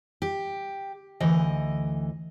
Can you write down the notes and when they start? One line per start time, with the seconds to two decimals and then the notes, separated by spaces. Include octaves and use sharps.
0.22 G4
1.20 D2 E3 D#5